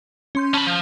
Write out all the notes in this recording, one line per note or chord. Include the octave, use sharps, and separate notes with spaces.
C#4 C6 G6
C#4 A5 B5
F3